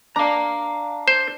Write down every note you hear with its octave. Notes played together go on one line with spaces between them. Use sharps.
D4 F5 A#5
C5